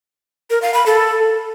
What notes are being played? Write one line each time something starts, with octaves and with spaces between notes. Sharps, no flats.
A#4
F5
B5
A4